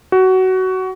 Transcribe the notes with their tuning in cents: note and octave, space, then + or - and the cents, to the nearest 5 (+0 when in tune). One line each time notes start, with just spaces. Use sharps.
F#4 +20